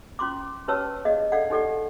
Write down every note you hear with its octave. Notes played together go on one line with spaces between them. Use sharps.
C#4 F4 C6 D6
C#4 G4 B4 C#5 A5 E6
G#4 D5 D#5 F5
D4 A4 D5 F5 F#5
D#4 G4 A4 D5 F#5